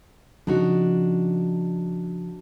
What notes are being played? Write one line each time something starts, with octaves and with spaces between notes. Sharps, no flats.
C#3 F3 D4 D#4 F#4